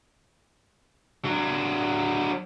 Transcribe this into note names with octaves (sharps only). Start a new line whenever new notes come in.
F#3 D4